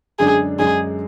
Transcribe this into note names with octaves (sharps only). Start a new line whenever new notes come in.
F#2 D3 G#3 D4 G#4
F#2 D3 G#3 D4 G#4